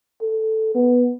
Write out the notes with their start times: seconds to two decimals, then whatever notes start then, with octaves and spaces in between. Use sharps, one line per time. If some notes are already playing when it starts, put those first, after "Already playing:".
0.22 A4
0.75 B3